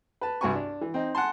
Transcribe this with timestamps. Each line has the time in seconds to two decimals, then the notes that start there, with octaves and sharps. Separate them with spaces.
0.21 B4 A5
0.41 C2 G2 F#4 B4 G#5 C#6
0.55 D4
0.81 E3
0.94 C4 D#4
1.15 F#5 G#5 A5 C6